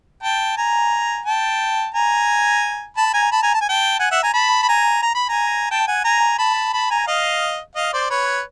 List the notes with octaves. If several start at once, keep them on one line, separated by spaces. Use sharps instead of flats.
G5 A5
G#5 A#5
G5 A5
G#5 A#5
A5 B5
G#5 A#5
A5 B5
G#5 A#5
A5
G#5
G5 A5
F#5 G#5
E5 F#5
G#5 A#5
A5 B5
B5
G#5 A#5
A#5
B5
G#5 A#5
G5 A5
F#5 G#5
G#5 A#5
A5 B5
A5 B5
G#5 A#5
D#5 F5
D#5 F5
C5 D5
B4 C#5